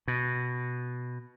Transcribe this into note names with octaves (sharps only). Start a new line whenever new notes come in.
B2